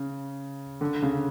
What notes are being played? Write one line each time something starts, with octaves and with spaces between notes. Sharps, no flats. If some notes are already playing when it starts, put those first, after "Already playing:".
Already playing: C#3
D3
C#3